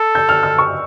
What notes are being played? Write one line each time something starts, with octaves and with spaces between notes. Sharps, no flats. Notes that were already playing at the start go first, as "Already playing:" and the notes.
Already playing: A4
G6
F6
E6
C#6